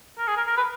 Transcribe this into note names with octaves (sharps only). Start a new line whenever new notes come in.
A#4
G#4
A#4
A#4
B4